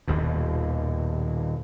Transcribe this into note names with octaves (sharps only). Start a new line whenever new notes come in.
D#1 D#2 B2